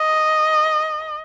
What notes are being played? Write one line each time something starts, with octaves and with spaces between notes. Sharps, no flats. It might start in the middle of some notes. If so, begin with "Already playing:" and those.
Already playing: D#5